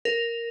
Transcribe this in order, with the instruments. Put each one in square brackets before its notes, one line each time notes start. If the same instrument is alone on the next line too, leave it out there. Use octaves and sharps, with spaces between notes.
[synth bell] A#4